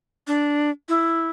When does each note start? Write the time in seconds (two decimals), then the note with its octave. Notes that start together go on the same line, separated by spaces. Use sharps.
0.27 D4
0.89 E4